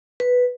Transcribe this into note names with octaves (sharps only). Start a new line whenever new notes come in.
B4